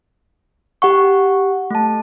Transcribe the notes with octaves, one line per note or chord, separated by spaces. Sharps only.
G4 F#5 C#6
A3 A5